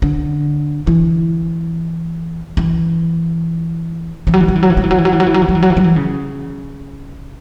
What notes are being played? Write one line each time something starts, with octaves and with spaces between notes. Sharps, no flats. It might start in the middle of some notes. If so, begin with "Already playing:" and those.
D3
E3
E3
E3
F#3
E3
F#3
E3
F#3
E3
F#3
E3
F#3
E3
F#3
E3
F#3
E3
F#3
E3
F#3
E3
F#3
E3
F#3
E3
C#3